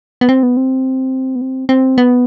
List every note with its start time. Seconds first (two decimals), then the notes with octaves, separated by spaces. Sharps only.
0.21 B3
0.29 C4
0.43 B3
0.57 C4
1.36 B3
1.41 C4
1.69 C4
1.98 B3